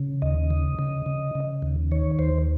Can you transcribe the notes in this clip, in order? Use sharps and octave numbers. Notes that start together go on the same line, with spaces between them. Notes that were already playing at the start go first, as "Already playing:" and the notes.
Already playing: C#3
D#2 D#5
C#3
C#3
C#3
C#3
D#2
D#3 C#5
D#2 C5